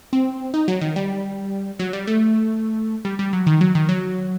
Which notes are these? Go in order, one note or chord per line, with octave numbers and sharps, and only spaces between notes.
C4
D#4
F#3
D#3
G3
F#3
G3
A3
G3
G3
F#3
D#3
F#3
D#3
F#3